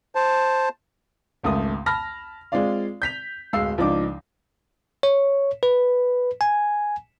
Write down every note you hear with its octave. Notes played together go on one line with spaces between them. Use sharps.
C5 A5
G#1 C#2 A3 D#6
A5 B5 F6 A#6
G#3 C4 F4 D5 F5
G6 B6 F7
D1 G#3 F5 E6 C7
C#2 F3 D4 D#4 D6
C#5
B4
G#5